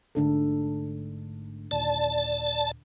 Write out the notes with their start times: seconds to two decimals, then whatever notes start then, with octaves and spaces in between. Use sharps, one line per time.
0.15 A1 G#2 D3 A3 D4 A4
1.71 D#2 A#2 D5 A5